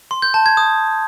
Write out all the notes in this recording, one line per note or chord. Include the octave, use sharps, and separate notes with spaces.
C6
G6
A5
G#6
D#6